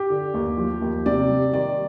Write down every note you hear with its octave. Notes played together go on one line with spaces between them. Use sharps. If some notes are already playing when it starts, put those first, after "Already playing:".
Already playing: G4
D3
D#2
F3
D#2
C3 D5
G3
D#3 D5